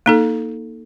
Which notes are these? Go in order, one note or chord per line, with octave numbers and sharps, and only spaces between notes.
A#3 D#4 A4